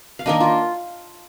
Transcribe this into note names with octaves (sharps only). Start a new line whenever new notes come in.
F5
D#3 A#3 D4 D#5
F4